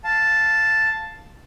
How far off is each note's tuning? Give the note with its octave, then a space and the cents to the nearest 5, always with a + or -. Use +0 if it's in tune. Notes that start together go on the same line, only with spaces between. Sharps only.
F5 +0 A5 +0